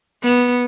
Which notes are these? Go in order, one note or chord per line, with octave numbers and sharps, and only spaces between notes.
B3